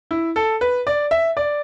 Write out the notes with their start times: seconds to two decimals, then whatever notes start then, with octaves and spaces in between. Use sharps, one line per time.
0.11 E4
0.36 A4
0.61 B4
0.87 D5
1.11 E5
1.37 D5